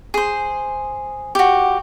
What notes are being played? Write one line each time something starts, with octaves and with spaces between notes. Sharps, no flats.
G#4 C5
F#4 G4